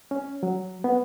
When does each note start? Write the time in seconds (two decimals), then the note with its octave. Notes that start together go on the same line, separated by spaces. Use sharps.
0.11 C#4
0.43 F#3
0.84 B3